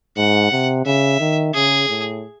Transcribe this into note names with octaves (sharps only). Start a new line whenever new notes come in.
G#2 F#5
C3
C#3 E5
D#3
C#3 G#4
A2